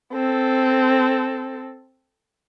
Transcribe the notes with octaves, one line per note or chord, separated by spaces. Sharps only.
C4 A4